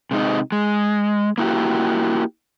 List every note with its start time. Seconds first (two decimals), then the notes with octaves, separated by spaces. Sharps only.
0.11 C3 G#3 D#4
0.52 G#3
1.38 A#3 E4 F#4 G4